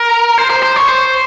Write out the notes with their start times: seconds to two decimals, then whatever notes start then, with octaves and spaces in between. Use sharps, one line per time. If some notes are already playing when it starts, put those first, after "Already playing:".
Already playing: A#4
0.38 C5
0.50 C5
0.63 C5
0.76 C#5
0.89 C5